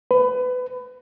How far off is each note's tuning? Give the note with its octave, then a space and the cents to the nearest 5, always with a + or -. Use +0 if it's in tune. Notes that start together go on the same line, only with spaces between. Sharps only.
B4 +25